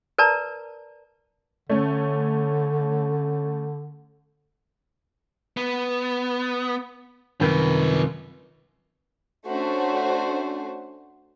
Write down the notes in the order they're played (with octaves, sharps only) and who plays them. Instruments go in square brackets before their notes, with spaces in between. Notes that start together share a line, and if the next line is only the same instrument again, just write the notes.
[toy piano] A#4 B4 D5 A5 A#5
[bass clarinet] D3 [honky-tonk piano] A3 C#4
[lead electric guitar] B3
[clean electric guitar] C2 F#2 D#3 [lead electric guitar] F4 B4
[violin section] A3 C#4 D4 F#4 C5